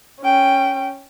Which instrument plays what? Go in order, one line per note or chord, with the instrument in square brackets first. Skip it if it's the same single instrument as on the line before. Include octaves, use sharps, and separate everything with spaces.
[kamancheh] C#4 G5